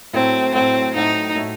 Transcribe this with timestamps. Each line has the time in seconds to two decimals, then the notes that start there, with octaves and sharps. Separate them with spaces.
0.13 A2 F#3 A3 C4 E4
0.54 A2 F#3 A3 C4 E4
0.95 A2 F#3 A3 D#4 E4
1.35 A2 F#3 A3 E4